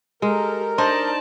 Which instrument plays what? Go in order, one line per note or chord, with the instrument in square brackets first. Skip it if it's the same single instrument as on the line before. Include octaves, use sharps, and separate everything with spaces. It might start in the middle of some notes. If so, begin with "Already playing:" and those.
[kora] G#3 [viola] G4 A4 [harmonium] A#4
[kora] D4 [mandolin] D#4 C5 [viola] D5 A5